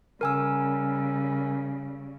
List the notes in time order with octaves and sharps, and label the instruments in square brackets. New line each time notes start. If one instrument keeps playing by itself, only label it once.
[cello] C#3 G3 [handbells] A#4 G#5 E6